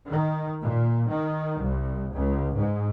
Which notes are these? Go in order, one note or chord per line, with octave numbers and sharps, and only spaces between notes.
D#3
A#2
D#3
C2
C#2
G#2